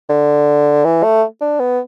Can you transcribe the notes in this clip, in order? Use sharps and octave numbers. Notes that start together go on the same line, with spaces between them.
D3
E3
A3
D4
B3